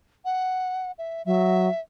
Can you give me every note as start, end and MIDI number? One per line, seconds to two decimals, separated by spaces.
0.25 0.92 78
0.98 1.22 76
1.26 1.68 54
1.26 1.80 76